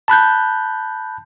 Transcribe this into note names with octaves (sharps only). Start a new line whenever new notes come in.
A5 B5 F#6 G6